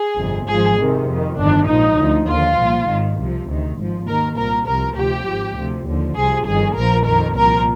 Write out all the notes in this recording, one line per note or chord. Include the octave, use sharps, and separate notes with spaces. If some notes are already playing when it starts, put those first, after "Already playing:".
Already playing: G#4
G1 F2 C3
G#1 G#2 F3 G#4
F2 C3 D#3
F2
D#3
G1 F2 D#3 D4
A#1 G#2 F3 D#4
D2 D3 F3
D#2 D3 F3 F4
C2 A#2 F3
G#1 G#2 D#3
C2 C3 F3
D2 C3 D#3
G#1 G#2 F3
D#2 D#3 A#4
C2 A#2 F3 A#4
C2 C3 F3 A#4
D2 C3 F3 G4
G#1 G#2 F3
D2 C3 F3
D#2 D3 F3
C2 C3 F3 G#4
G1 F2 D#3 G#4
A#1 A#2 F3 A#4
F2 D#3 A#4
C2 A#2 F3 A#4